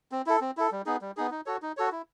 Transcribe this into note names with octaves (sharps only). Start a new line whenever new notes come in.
C4
E4 A4
C4
E4 A4
G3
B3 D#4 G#4
G3
B3 D#4 G#4
D#4
F#4 A4 C#5
D#4
F#4 A4 C#5
E4